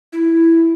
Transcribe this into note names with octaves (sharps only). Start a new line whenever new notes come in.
E4